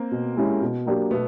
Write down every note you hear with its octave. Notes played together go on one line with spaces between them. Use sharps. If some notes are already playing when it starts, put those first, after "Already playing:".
Already playing: A#3 C4
B2
G#3 C#4 E4 G4
B2
F#3 A#3 D4 G4
B2 A3 B3